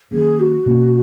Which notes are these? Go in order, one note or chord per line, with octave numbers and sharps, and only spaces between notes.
D#3 F#3 A#3 C#4 G#4
F#4
B2 A#3 C#4